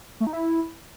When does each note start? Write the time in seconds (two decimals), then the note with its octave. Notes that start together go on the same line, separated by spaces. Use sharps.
0.20 A3
0.27 D#4
0.33 E4